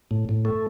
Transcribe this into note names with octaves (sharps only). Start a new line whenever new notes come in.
A2
A2
A3